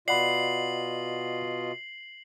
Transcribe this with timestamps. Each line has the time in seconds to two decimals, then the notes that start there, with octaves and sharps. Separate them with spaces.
0.08 B2 F4 D5 D#5 F#5 B5 C7 F#7